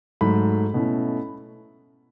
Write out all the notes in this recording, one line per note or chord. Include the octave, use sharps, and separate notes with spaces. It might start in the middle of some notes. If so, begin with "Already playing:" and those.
G#2 F#3 A3 B5
B2 A3 C#4 E4